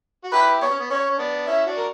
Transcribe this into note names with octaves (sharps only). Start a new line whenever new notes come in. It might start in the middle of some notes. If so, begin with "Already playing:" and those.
F#4
E4 G4 B4
B3 C#5
C#4
B3
C#4 C#5
C#4
B3 D4
C#4 E4 E5
D4 F#4
A#4